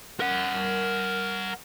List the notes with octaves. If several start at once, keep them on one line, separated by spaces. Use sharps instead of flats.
A#4 F#5